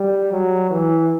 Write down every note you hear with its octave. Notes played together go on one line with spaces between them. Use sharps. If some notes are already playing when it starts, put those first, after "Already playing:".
Already playing: G3
F#3
E3